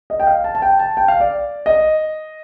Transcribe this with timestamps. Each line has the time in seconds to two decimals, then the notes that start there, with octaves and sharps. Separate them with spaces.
0.10 D#5
0.20 G5
0.27 F5
0.44 A5
0.55 A5
0.62 G5
0.79 A5
0.97 G5
1.08 F5
1.20 D5
1.66 D#5